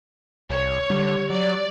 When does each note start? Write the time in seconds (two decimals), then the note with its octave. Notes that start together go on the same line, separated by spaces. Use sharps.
0.50 C2 C#5
0.90 D3 G3
1.30 F#3 D5